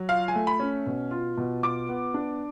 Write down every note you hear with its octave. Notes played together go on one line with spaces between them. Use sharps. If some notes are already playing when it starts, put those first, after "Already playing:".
Already playing: F#3
F4 F5
G#5
A3
B5
C#4
B2
F4
B2
F4 D6
B3
D4